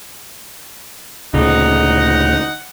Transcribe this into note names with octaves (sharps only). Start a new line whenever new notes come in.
D2 A#2 C#3 D#4 F#5